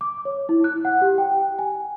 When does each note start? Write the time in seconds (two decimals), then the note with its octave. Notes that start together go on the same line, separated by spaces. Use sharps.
0.01 D6
0.25 C#5
0.49 E4
0.64 F#6
0.85 F#5
1.02 G4
1.18 G5
1.59 G#5